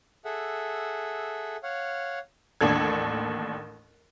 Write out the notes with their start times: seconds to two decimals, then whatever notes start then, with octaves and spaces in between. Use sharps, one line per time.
0.25 G#4 A4 E5 F#5
1.63 C#5 F5 F#5
2.61 A1 D#2 D4 A4 G#6